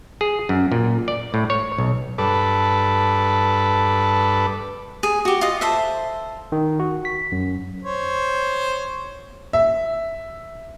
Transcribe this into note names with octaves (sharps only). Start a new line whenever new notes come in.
G#4
F#2
A#2
D5
A2
C#5
B1
G2 A4 B4 D6
G#4
F#4 G4
F4 D#5
A4 C5 E5
D#3
F#4
B6
F#2
C5 C#5
E5